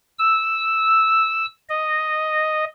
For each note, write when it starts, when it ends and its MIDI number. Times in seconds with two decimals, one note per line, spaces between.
0.19 1.45 88
1.69 2.64 75